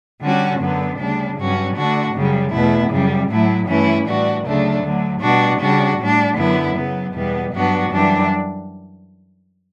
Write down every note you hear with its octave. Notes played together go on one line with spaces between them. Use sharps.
D3 G3 C#4 F#4
F#2 D3 F#3 B3
D2 C#3 G3 D4
G2 F#3 C#4 F#4
D3 A3 D4 F#4
F#2 C#3 G3
E2 B2 A3 E4
F#2 C#3 G3
A2 F#3 A3 E4
G2 E3 A3 C#4 E4
A2 E3 G3 D4 F#4
D2 C#3 F#3 A3 D4
D2 D3 F#3
B2 G3 D4 F#4
C#3 G3 D4 F#4
A2 G3 D4
F#2 D3 F#3 B3 E4
C#3 F#3 B3
E2 B2 G3 B3
G2 F#3 B3 D4 F#4
F#2 E3 G3 D4